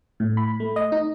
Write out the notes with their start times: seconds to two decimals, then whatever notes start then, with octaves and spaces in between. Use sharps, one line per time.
0.20 A2
0.37 B5
0.60 A3
0.76 D#5
0.92 D#4